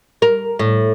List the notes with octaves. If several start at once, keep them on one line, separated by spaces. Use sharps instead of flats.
A#4
A2